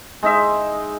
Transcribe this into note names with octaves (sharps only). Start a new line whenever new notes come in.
G#3 D#4 D#5 E5